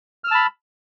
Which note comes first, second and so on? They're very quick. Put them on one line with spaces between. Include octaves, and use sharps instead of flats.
F6 E6 A5 B5